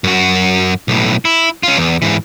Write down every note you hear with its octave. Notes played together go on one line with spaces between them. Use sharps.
F#2 F#4
B1 A2
E4
C#4 F4
E2
G#2 E3